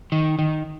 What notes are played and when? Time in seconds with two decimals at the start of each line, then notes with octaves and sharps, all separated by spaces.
0.12 D#3
0.39 D#3